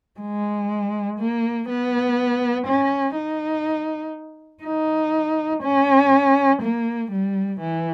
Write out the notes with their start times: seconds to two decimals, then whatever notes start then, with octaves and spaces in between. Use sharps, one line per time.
0.20 G#3
1.19 A#3
1.68 B3
2.67 C#4
3.16 D#4
4.64 D#4
5.63 C#4
6.62 A#3
7.12 G3
7.60 E3